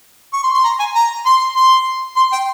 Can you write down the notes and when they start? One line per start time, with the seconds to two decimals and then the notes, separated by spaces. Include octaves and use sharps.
0.33 C#6
0.44 C6
0.54 C6
0.64 A#5
0.79 G#5
0.95 A#5
1.26 C6
1.56 C6
2.16 C6
2.32 G5